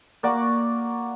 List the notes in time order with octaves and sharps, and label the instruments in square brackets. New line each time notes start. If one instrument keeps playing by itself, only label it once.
[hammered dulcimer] A#3 F#4 D5 C#6